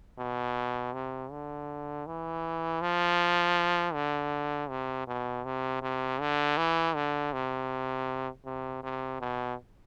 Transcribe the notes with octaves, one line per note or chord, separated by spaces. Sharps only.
B2
C3
D3
E3
F3
D3
C3
B2
C3
C3
D3
E3
D3
C3
C3
C3
B2